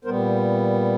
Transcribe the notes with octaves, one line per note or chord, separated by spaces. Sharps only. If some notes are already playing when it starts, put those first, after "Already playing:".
A#2 G3 B3 A#4 C5